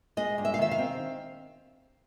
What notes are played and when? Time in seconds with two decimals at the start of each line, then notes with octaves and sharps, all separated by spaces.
0.17 G#3 D#5
0.38 G2
0.45 E5
0.54 F5
0.59 D#3 E5
0.71 F5
0.78 C4